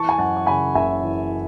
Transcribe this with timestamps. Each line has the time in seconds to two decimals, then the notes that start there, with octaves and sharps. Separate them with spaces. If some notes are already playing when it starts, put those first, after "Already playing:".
Already playing: E3 A5 C#6
0.09 G#5
0.18 F#2 F#5 A5
0.37 C#6
0.46 C#3 G#5 B5
0.75 F#1 E5 G#5
1.03 E3